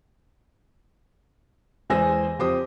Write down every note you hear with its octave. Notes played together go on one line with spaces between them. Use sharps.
E2 G#3 C5 G#5 E6 A#6
F2 G4 C5 D#6